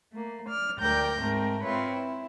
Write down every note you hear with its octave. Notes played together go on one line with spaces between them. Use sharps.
A3 A#3
D5 F6
D2 A#4 D5 G5 G6 A#6
G#2 A3 C4 A#4
C4 F4 B4 C#5 E5
E4